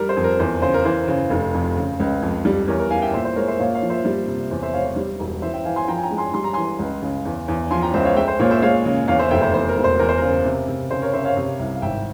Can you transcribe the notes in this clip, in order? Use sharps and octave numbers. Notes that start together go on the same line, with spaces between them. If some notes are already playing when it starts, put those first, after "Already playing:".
Already playing: G3 A#4
C5
F2
A#4
E2 C5
C#3 C5
A#4
E3 C5
C#3
F1
F2
C#3
C#2
F2
G3
E2 A#4 C#5
A#4
E3 F5 G#5
E5 G5
A#2 C5 E5
C5
G#3 A#4 C#5
C5 E5
A#2 C#5 F5
C#5 F5
F3
C5 E5
G3
C3
E2 C5
C5 E5
E1 C#5 F5
C5
G3
E1
E3 C5 E5
E5 G5
E3 F5 G#5
G#5 C6
F3 G5 A#5
G#5
G5 A#5
G#3
G#5 C6
G3 C6
A#5
E3 G#5 C6
C#2
C#3
E2
E2
F3 G#5 C6
G5 A#5
C#2 C5 E5
C#5 F5
G#3 E5 G5
C5
A#2 A#4 C#5
C5 E5
G#3 C#5 F5
C#3
E2 C#5 F5
C5 E5
F1 E5 G5
C5 E5
E2 C5
A#4
E1
C5
E2 A#4
C5
C#3 A#4
C3
C3
C#3 C5
A#4 C#5
C#3 C5 E5
C#5 F5
C3
C2
F5
G#1 E5 G5